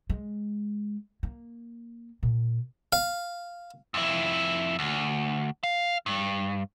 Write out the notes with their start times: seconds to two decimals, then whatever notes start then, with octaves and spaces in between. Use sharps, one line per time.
0.10 G#3
1.23 A#3
2.23 A#2
2.93 F5
3.94 F2 E4
4.79 D2
5.63 F5
6.06 G2